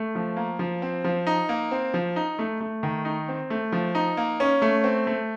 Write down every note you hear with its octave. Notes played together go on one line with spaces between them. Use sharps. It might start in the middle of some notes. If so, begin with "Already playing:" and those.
Already playing: A3
F3
A#3
F3
C4
F3
D#4
A#3
C4
F3
D#4
A3
A3
D#3
D#4
C4
A3
F3
D#4
A#3
C#4
A3
C4
A3